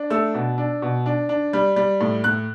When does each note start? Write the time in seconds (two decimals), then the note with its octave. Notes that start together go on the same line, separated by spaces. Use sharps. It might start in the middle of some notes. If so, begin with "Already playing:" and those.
Already playing: D4
0.10 A3 E6
0.34 B2
0.58 D4
0.82 B2
1.06 D4
1.29 D4
1.53 G3
1.76 G3
2.01 A2
2.24 A2 F#6